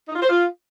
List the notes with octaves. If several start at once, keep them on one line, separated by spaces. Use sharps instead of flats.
D#4
F4
C5
F4